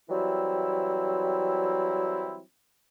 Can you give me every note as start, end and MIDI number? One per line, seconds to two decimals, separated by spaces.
0.10 2.41 52
0.10 2.41 54
0.10 2.41 55
0.10 2.41 60
0.10 2.41 64